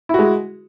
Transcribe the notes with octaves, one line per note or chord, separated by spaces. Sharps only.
G#3 E4 F#4